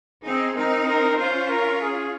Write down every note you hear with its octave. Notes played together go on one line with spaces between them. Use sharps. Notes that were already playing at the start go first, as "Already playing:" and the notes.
C4 D#4 G#4
C4 D#4 A#4
A#4
C#4 F4 C5
A#4
G#4